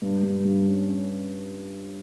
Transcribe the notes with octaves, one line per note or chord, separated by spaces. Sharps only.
G2
G2
G2
C#4
C#4